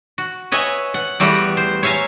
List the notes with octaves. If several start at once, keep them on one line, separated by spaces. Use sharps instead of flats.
F#4
B4 C#5 D#5 E5 G#5
F#5
E2 G3 A3 F#4
C5
C#5 E5 F5 G#5 A#5